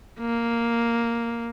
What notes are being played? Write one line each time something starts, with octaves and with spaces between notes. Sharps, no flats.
A#3